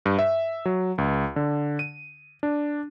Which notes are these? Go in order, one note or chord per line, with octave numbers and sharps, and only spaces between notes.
G2
E5
F#3
C#2
D3
D#7
D4